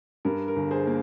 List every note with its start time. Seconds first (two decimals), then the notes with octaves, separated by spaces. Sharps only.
0.25 G2 A#4
0.48 A#4
0.56 G1
0.71 G#4 C5
0.87 A#3